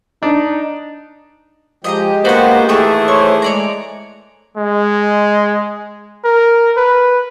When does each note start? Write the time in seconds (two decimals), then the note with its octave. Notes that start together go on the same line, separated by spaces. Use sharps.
0.23 D4 D#4
1.84 F3 G#3 G4 D#5 E5 A#5
2.25 D2 A#3 B3 F#4 C5 F#5
2.69 D#3 E3 A3 G#4 A4 E5 C#6
3.08 C5 C#5 C#6
3.42 G#3 C#5 D5 A#5
4.57 G#3
6.24 A#4
6.77 B4